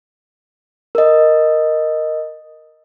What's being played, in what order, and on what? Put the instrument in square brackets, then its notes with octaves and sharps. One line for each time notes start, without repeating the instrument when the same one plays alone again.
[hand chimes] A#4 D#5